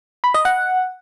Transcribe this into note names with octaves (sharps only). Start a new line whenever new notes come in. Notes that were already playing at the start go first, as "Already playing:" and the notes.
B5
D#5
F#5